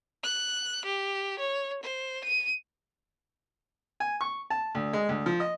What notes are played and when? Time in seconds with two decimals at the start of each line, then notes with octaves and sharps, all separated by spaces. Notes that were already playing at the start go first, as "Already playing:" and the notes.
0.23 F#6
0.86 G4
1.39 C#5
1.83 C5
2.25 D#7
4.00 G#5
4.21 C#6
4.50 A5
4.75 D2
4.93 G#3
5.09 D2
5.26 F3
5.40 D#5